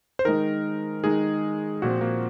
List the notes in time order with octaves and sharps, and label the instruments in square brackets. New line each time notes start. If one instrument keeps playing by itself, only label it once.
[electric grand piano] C5
[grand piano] D#3 G#3 D#4 [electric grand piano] A#4
[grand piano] D#3 G#3 D#4 [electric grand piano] G#4
[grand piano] A#2 F3 C4 [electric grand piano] F#4
[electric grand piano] A#3